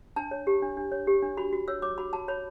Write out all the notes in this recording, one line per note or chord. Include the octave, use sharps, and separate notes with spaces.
D4 A5
C#5
G4
D4
D4
C#5
G4
D4
F#4 B5
F#4
C#5 E6
C#5 D6
F#4 B5
F#4 A5
C#5 B5